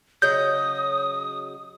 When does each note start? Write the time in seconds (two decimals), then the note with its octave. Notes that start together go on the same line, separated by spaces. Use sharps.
0.22 C#3 F#3 D#5 D#6 G6